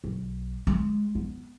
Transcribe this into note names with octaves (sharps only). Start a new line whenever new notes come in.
B1
G#3
B3